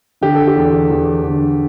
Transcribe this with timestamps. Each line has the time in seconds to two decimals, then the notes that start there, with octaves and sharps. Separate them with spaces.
0.21 D3 G4
0.34 A4
0.47 G4
0.56 E2
0.90 E2
1.23 D3